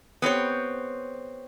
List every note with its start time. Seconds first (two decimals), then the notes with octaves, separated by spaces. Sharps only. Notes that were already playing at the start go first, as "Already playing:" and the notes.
0.22 B3 C4 G4 C#5